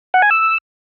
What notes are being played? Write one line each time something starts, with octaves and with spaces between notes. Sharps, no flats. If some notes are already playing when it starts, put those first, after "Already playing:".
F#5
G#5
E6